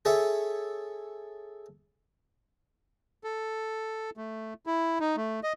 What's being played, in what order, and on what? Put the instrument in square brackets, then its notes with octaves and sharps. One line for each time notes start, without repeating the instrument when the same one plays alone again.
[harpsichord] G#4 A4 C#5 E5
[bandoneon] A4
A3
E4
D#4
A3
D#5